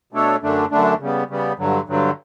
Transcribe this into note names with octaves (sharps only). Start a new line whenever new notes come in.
B2 A3 D4 A4 C#5
F#2 D3 A3 D4
F#2 D3 A3 D4
C#3 G3 B3
C#3 G3 B3
G2 D3 F#3
G2 D3 F#3